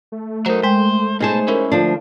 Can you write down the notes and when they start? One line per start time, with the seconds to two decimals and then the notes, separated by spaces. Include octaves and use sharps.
0.12 A3
0.46 F#3 D#4 A#4 C5
0.63 G#3 C5 G5
1.20 B2 D#4 G#4 C5 A5
1.48 C#4 E4 A#4
1.72 D2 F3 D4